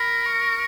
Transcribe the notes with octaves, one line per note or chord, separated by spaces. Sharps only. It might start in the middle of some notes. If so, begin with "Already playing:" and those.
Already playing: A#4 B5
C#6